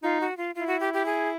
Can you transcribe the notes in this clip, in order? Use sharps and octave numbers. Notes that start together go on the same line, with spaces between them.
D#4 F4
F#4
F4
E4 F4
F#4
G4
G4
G#4